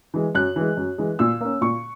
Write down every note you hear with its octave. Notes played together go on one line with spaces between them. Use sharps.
E3 G#3
F#2 F#6
E3 G#3
F#2
E3 G#3
A#2 E6
A#3 C#4
A#2 C#6